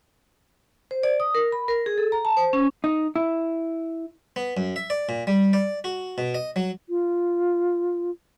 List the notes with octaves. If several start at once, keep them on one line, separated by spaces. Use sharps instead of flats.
C5
D5
D#6
A#4
B5
A#4
G#4
A4
A#5
A5
C5
C#4
D#4
E4
B3
F#2
E5
D5
A#2
G3
D5
F#4
B2
D#5
F#3
F4